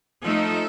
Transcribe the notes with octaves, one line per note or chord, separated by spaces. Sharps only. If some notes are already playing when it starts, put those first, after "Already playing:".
F3 A3 D#4 A4